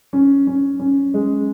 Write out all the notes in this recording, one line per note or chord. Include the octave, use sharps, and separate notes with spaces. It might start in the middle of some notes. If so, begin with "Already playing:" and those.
C#4
C#4
C#4
G#3